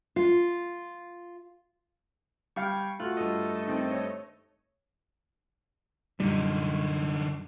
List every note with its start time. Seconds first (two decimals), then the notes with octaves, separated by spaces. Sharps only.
0.16 F4
2.56 G3 F5 G5 C#6 G#6
3.00 A3 F4 F#4 F#6
3.17 G2 A4 D#5
3.67 D#3 C4
3.92 C#5
6.20 F#2 A#2 D3 G3 D#4